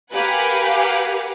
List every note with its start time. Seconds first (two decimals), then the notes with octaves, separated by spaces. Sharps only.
0.13 G4 A#4 B4 F5 F#5 G#5